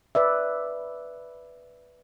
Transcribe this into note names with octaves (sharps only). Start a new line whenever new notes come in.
B4 D5 E5